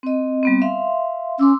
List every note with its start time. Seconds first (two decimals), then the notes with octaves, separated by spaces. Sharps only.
0.03 C4 D#5
0.43 G3 B3 C4
0.62 E5 F5 C6
1.39 C#4 C6 D6 E6